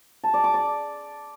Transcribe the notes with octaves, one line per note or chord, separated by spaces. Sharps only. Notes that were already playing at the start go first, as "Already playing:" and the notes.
A5
D5
D6
D5